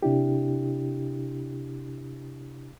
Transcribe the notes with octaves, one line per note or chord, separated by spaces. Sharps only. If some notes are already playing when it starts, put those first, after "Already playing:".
C3 D4 E4 G4